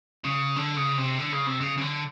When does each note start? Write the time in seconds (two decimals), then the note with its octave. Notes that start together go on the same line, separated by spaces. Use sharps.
0.25 C#3
0.56 D3
0.77 C#3
0.98 C3
1.19 D3
1.33 C#3
1.47 C3
1.61 C#3
1.78 C#3
1.81 D3